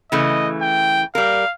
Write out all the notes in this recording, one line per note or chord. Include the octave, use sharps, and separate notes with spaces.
C#3 E3 A3 D#5
G5
G3 A#4 F5